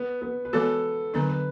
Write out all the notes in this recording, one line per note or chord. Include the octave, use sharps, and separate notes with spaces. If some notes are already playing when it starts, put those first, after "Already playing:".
Already playing: B3
B3
B4
E3 G#3 B3 F#4 A4
D3 F#3 B3 D4 B4
B4